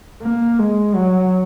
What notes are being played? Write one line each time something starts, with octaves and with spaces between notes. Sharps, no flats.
A#3
G#3
F#3